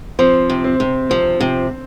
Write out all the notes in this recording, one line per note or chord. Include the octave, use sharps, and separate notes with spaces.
F3 C4
C3
C4
C3
F3 C4
C3